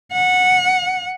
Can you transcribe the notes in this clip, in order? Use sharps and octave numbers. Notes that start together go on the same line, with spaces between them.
F#5